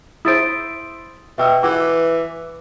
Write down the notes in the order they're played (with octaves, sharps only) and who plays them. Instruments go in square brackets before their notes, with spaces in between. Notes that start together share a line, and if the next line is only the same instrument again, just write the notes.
[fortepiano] E4 C5 [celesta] D#6 A6 D7
[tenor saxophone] B2 [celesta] E5 G5 E6
[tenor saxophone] E3 [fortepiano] F#4 [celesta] B4 D6